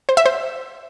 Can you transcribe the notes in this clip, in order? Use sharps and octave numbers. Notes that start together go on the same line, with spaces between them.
C5
E5
C5